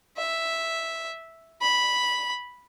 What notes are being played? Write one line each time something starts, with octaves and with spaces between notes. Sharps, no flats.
E5
B5